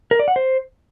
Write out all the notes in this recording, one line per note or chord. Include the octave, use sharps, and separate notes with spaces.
A#4
D5
F#5
C5